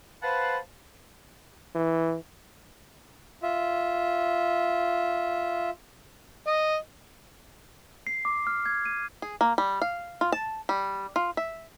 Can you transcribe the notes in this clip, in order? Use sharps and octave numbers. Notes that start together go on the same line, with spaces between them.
B4 C5 F5 F#5 A5 B5
E3
F4 E5
D#5
C7
D6
F6
G#6
D#7
G#4
A#3
G3
F5
F4
A5
G3
F4
E5